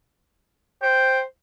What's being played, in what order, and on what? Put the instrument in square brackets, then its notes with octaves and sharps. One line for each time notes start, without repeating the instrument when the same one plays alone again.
[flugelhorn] C5 [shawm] G5